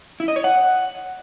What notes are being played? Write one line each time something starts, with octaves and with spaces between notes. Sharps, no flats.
E4
D#5
C#5
F#5